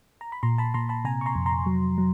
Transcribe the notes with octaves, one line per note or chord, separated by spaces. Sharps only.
A#5
B5
A#2 A#5 C6
A5 B5
A#2 A#5 C6
A5 B5
C3 G#5 A#5
C#6
A#5 C6
F2
A#5 C6
F#3
F#3